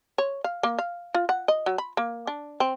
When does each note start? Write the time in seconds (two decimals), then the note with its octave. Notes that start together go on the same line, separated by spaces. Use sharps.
0.18 C#5
0.44 F5
0.63 A#3
0.79 F5
1.15 F4
1.29 F#5
1.48 D#5
1.66 F#3
1.78 B5
1.97 A#3
2.27 D4
2.60 C4